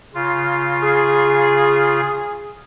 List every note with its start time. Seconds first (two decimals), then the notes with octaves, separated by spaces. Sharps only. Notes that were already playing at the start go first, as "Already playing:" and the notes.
0.15 C#3 F4
0.83 G#4